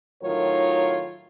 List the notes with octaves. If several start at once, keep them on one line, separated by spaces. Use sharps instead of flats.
A2 D#3 F#3 F4 A#4 C#5